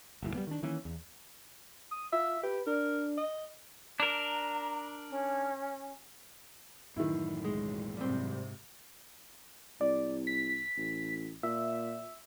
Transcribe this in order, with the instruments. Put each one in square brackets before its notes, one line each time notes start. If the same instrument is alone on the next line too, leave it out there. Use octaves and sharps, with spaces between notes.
[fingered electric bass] F#1 D#2 A2
G3 A#3 B3
D#3 D4
D#3 E3 A#3 C#4
E2
[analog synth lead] D#6
[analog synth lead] F4 [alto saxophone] E5
[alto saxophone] G4 [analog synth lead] B4
[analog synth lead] D4 [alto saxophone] A#4
[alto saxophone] D#5
[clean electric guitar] D4 A#4 [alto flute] A#5
[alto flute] C#4
[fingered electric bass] F#2 A2 E3 [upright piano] D#3 E4
[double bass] B1 [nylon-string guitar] G#3
[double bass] G#2 C3 [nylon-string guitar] G3 C4
[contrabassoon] C2 [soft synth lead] D5
[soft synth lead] B6
[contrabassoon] A1
[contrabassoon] A#2 [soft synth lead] E5